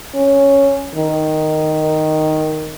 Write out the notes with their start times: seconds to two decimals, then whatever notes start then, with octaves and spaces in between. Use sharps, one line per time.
0.15 C#4
0.95 D#3